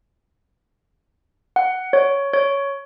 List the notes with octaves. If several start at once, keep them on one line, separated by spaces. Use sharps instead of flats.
F#5
C#5
C#5